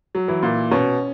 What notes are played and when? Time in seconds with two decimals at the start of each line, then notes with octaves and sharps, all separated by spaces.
0.15 F#3
0.28 E3 E4
0.42 A#2
0.71 B2 C#4